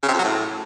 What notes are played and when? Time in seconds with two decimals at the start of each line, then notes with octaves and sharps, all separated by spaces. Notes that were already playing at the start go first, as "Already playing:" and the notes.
0.03 C#3
0.08 C3
0.14 F2
0.19 F#3
0.24 A2